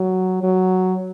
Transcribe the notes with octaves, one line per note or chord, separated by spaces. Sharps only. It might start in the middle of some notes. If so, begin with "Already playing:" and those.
Already playing: F#3
F#3